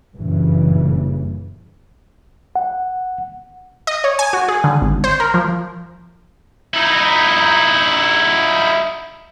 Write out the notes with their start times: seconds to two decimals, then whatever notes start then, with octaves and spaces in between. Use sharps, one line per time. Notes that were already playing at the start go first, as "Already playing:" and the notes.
0.16 F#1 G2 A#2 C#3 E3
2.56 F#5
3.87 D#5
4.04 C#5
4.19 G#5
4.33 F#4
4.48 G#4
4.64 D3
4.82 G#1
5.04 C5
5.20 A#4
5.34 F3
6.74 D#4 E4